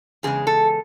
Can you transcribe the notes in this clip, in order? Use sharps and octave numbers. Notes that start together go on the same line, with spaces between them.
E2 C#3 G#3 G#4
A4